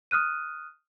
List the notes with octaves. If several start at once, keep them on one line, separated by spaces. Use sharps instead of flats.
D#6 F6 F#6 D#7